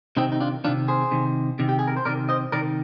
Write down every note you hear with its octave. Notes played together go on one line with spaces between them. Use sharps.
C3 D#3 C4 D#4
D#4
D4 F4
C3 D#3 D4 F4
G#4 C5
C3 D#3
C3 D#3
G4
G#4
A#4
C5
C3 D#3 A#4 D5
C5 D#5
C3 D#3 A#4 D5